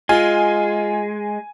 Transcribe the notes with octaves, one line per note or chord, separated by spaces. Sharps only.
G#3 F4 G#5